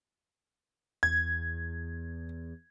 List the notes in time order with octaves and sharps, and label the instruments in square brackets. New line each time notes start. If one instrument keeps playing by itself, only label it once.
[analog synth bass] E2 [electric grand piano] G#6